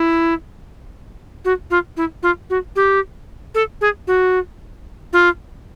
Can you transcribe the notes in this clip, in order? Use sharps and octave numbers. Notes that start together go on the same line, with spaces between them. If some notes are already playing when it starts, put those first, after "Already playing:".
Already playing: E4
F#4
F4
E4
F4
F#4
G4
A4
G#4
F#4
F4